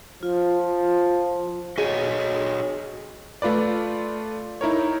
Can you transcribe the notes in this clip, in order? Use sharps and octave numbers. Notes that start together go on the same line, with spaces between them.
F3 F4
F#4 G#4 C#5 D#5
A3 F4 B4 D5
D#4 E4 A#4 C#5